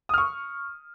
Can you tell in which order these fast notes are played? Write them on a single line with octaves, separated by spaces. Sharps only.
D#6 F6 C#6